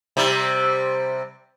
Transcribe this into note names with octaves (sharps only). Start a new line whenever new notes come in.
C3 G3